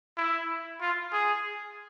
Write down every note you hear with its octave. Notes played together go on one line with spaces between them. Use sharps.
E4
F4
G#4